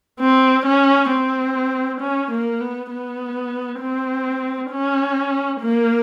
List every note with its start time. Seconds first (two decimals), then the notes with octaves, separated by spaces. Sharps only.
0.20 C4
0.66 C#4
1.11 C4
2.01 C#4
2.31 A#3
2.61 B3
2.91 B3
3.80 C4
4.71 C#4
5.61 A#3